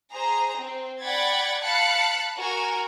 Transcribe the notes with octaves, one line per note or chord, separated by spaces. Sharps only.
G#4 C5 A#5
C4
D5 F#5 G5 B5 G#6 A6
F5 A5 B5 F#6 A6 C#7
F#4 A#4 G#5